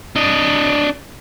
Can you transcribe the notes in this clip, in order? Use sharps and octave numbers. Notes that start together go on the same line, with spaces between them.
D4 D#5